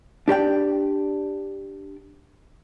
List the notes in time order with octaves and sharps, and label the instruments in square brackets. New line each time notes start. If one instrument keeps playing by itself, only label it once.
[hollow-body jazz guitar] D4 G4 D5 G5